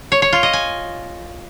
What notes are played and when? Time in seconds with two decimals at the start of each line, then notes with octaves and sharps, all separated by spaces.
0.12 C#5
0.22 C#5
0.33 F4
0.43 D#5
0.53 G#5